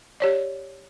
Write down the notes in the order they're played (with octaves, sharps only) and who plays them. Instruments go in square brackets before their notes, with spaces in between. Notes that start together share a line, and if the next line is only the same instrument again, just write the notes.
[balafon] G4 C#5 D5